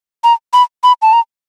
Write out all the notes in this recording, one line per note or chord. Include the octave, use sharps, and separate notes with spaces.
A#5
B5
B5
A5
A#5